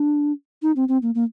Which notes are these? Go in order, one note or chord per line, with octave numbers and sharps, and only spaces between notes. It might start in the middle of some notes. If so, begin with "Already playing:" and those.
Already playing: D4
D#4
C4
C4
A#3
A#3